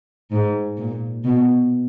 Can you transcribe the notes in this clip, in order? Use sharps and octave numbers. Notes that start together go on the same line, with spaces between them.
G#2
A#2
B2